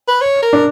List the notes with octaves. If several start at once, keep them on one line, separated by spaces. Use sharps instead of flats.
B4
C#5
A#4
D4